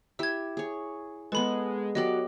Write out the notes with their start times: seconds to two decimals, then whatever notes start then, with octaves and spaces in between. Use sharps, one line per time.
0.19 E4 G4 E5 E6 G#6
0.57 G#4 C#5
1.32 G#3 B3 A4 B4 B5
1.95 F#3 B3 G4 A4 D5 D#5